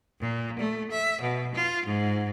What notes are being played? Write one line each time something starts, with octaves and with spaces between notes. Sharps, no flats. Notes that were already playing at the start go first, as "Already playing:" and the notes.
A#2
A3
E5
B2
F4
G#2